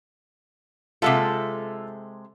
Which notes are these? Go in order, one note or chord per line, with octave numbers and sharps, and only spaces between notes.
C3 G#3 F4 A4 E5 F#5